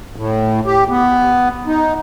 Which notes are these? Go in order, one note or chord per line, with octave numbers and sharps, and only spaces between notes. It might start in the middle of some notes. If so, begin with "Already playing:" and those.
A2
G4
B3
D#4